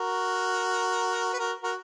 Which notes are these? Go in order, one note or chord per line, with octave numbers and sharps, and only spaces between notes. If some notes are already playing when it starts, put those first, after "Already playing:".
Already playing: F#4 A#4
B4
F#4 A#4
F#4 A#4